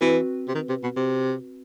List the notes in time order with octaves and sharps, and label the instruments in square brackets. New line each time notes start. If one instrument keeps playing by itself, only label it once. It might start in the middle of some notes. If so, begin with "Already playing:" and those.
[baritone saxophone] E3 [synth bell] C4 F#4 B4
[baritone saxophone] C3
D#3
C3
B2
C3